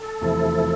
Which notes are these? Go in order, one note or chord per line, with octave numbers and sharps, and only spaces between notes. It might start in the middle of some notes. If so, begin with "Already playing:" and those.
Already playing: A4
E2 C3 F3 A3 E4